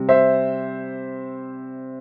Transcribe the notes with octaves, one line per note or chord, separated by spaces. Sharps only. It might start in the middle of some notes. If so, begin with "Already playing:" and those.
Already playing: C3 G3
C5 E5